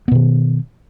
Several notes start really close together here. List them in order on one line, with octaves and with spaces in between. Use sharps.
B3 B2 D#3